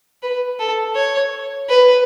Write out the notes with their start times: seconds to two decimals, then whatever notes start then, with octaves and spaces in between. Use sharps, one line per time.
0.23 B4
0.59 A4
0.96 C#5
1.69 B4